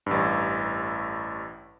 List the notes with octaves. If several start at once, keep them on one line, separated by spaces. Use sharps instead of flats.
A1 G2